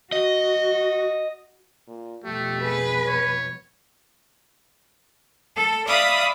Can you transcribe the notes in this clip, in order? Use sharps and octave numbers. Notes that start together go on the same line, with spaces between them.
F#4 D#5
A#2
F2 B2 G3 A3 G4
G#4 B4
C#5
A4
D5 E5 F5 B5 D#6